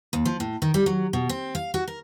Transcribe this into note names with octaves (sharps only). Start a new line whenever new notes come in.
D#2
F3
A2
D#3
G3
F#3
B2
C4
F5
F#4
A#4